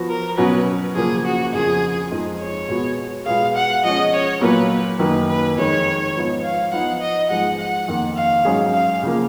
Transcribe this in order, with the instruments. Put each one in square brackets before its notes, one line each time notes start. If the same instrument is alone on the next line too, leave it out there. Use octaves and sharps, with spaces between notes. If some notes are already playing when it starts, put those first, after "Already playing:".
Already playing: [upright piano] F3 B3 F#4
[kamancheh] A#4
[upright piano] B2 F#3 C#4 F#4 [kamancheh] B4
[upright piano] C#3 F3 A#3 [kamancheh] G#4
[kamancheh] F#4
[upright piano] F2 C#3 F3 [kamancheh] G#4
[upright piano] F2 F3 G#3 D#4 G#4
[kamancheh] C#5
[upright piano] B2 G#3 B3 F#4
[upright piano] B2 G#3 B3 F4 G#4 [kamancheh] F5
[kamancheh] F#5
[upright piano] F3 G#3 C#4 [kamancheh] D#5
[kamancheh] C#5
[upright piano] A#2 F#3 A#3 F4 [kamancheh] B4
[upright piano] F#2 D#3 A#3 [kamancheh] B4
[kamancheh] B4
[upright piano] F2 D#3 G#3 D#4 [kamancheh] C#5
[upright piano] G#2 F3 B3
[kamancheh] F5
[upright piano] F3 B3 D#4 [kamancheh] F#5
[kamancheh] D#5
[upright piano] G#2 F3 G#3 [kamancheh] F#5
[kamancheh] F#5
[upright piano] F2 D#3 A#3
[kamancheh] F5
[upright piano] G#2 F#3 C#4 G#4
[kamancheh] F5
[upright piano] C#3 F3 A#3